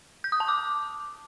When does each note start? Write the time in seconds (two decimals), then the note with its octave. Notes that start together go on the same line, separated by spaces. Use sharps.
0.24 G6
0.32 D#6
0.40 A5
0.48 D6